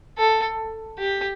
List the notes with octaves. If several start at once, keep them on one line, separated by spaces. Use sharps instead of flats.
A4
G4